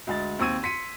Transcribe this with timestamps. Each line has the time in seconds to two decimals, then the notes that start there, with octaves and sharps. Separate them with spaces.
0.07 D2 G#3 A6
0.39 D#2 C4 C#6 E6 G#6 D#7
0.63 C6 B6 C#7 D#7